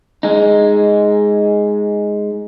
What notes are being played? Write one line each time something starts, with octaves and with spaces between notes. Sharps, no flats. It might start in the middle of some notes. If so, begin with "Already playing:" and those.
G#3 D#4